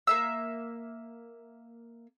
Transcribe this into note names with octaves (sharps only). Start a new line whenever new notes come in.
A#3 E5 E6